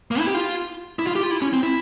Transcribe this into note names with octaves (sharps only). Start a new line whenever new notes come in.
A#3
E4
G4
F4
E4
F4
G4
F4
E4
C#4
C4
E4